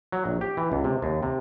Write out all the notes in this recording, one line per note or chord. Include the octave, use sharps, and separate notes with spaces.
F#3
A#1
G4
E3
C#2
C3
D#2
C3